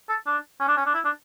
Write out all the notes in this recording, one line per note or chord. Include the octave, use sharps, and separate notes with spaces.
A4
D4
C#4
D4
C#4
D4
E4
D4